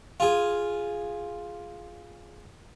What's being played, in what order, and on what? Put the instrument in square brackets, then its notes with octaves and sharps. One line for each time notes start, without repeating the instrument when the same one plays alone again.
[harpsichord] F4 G#4